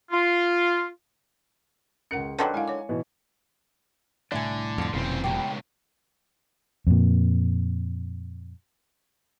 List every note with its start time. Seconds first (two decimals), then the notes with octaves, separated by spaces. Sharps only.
0.11 F4
2.11 C#2 C#4 A#4 F#5 C#7
2.39 D3 D#3 F#3 B4 C6
2.54 G#3 E4 F5 G#5
2.68 C#5 D6
2.89 B2 E3
4.32 C2 A2 D3 E4 D5 G#5
4.78 F2 A5 C6
4.94 F1 B1 A#2 C#3 E3 C4
5.24 C#2 B2 G4 A#5
6.87 F2 A#2